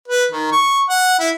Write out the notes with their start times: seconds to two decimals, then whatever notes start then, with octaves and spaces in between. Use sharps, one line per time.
0.08 B4
0.32 D#3
0.52 C#6
0.89 F#5
1.19 E4